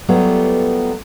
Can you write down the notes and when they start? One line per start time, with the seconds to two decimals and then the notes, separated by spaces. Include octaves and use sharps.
0.08 F#3 G3 A3 B3 F4 G4